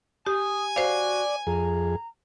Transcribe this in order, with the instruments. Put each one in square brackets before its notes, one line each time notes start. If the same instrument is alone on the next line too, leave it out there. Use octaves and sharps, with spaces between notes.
[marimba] G4 [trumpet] G#5 [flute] D#6
[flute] F#4 [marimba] C5 F5 [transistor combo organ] D5
[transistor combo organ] F2 G#4 [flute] A#5